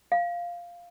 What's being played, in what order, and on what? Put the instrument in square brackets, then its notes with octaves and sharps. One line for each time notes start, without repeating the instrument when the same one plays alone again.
[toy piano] F5